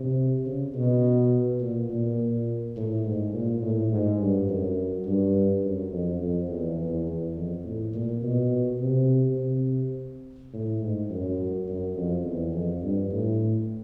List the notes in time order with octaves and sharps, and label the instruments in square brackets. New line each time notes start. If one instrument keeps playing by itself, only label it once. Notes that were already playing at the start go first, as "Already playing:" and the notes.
Already playing: [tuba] C3
C#3
B2
A#2
A#2
A2
G#2
A#2
A2
G#2
G2
F#2
G2
F#2
F2
F2
E2
E2
E2
F2
A2
A#2
B2
C3
C3
A2
G#2
F#2
F#2
F2
E2
F2
G2
A2